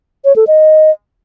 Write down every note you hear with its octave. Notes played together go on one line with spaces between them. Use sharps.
C#5
A4
D#5